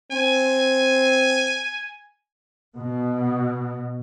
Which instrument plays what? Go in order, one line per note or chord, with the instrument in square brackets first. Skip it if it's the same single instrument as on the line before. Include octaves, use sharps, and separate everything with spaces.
[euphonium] C4 [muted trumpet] G#5
[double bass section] B2